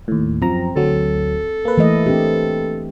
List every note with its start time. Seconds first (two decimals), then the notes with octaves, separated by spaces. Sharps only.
0.08 D#2 A2
0.42 F#2 F3 C4 A#5
0.76 D2 F#3 A4
1.65 A#3 B4
1.77 E3 A3 D#5
2.06 C4 D4 G4